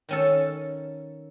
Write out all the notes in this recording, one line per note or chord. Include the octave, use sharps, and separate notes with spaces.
D#3 C#4 A4